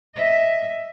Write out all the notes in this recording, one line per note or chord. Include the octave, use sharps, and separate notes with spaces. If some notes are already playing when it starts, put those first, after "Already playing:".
D#5 E5